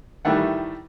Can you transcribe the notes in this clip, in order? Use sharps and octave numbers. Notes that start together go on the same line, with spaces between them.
A2 D#3 E3 G3 A3 F#5